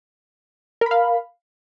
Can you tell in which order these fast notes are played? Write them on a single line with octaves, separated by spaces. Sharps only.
A#4 B5 F5